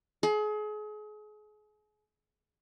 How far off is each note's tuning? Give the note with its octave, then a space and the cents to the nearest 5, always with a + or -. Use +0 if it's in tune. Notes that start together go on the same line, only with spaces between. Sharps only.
G#4 +35